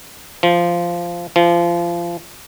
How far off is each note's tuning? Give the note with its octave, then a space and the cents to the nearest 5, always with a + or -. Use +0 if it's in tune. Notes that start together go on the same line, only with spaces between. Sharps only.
F3 -10
F3 -25